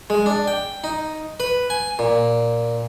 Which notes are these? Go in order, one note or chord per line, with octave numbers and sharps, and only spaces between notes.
G#3
D4
G5
D#4
B4
G#5
A#2